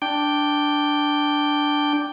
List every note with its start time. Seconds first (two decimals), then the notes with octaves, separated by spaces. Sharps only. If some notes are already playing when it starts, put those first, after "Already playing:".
0.02 D4 G5